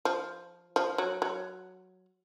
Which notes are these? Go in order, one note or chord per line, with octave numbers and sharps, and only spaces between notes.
F3
F3
F#3
F#3